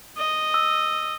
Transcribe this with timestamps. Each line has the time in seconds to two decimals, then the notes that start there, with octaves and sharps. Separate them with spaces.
0.17 D#5
0.54 E6